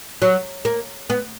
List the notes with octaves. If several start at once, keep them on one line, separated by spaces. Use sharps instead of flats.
F#3
A#3
B3